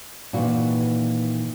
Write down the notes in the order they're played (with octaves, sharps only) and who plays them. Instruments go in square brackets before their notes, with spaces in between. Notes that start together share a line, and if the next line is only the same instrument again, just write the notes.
[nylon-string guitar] A#2 D#3 E3 F#4